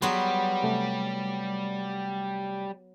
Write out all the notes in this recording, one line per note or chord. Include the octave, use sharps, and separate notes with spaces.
F#3 G3 B3 G#4 C6 C#6
C3 A3